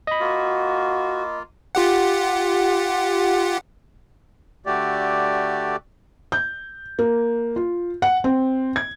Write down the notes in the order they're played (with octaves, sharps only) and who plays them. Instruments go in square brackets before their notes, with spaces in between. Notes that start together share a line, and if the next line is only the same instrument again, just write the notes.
[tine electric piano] D#5 B5
[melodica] A#3 F4 [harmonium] F#4
[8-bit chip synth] F4 G4 F#5
[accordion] D3 A3 F#4 G4 D5
[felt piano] G6
A#3
F4
F#5
C4
G#6